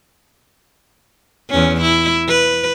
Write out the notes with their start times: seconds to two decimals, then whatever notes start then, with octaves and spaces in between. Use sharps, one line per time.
1.50 E2 C#4
1.81 E4
2.28 B4